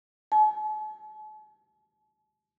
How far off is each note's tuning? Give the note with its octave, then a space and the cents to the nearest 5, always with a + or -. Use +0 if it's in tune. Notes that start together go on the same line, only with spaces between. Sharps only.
A5 -45